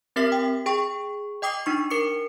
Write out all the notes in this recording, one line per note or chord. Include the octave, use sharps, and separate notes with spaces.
C4 G4 A#4 E5 F6 B6
G5
G#4 G5 C#6
D#5 G5 D6 D#6 C7
D4 D#4 C#6
A#4 D6 C#7